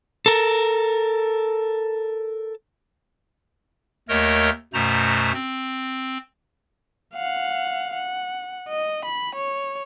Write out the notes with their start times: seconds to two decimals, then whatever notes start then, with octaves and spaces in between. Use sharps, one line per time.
0.26 A4 A#4
4.09 D#2 A3 A#4 C#5 D#5
4.73 F#2 B2 A3 C5 A#5
5.33 C4
7.14 F5 F#5
7.94 F#5
8.68 D#5
9.05 B5
9.35 C#5